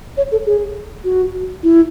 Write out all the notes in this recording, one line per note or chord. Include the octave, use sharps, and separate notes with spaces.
C#5
A4
G#4
F#4
E4